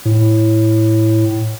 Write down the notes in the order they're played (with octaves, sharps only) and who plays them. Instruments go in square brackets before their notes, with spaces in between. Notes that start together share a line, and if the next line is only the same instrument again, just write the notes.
[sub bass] A2